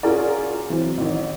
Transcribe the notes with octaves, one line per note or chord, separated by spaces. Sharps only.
C#4 F4 F#4 G#4 A#4 D5
E3 F#3 C4
A1 D#3